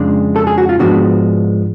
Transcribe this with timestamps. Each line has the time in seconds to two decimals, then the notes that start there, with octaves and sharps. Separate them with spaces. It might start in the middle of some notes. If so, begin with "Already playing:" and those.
Already playing: F2 C#3 G#3 D4
0.36 A4
0.47 G#4
0.58 F#4
0.69 F4
0.79 G#2 F3 G#3 B3 D4 F#4